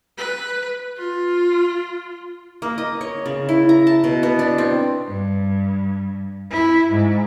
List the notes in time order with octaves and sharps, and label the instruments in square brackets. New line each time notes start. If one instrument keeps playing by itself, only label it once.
[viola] B4
F4
[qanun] A#3
D#5
C#5
C#3
E4
A#5
A5
B2
B3
D4
C4
[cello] G2
E4
G#2